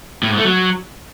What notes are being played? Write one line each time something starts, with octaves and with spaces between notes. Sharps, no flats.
A2
G#2
A3
F#3